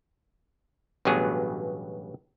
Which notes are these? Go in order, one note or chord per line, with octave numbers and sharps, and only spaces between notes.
A1 G2 B2 F#3 B3 G#4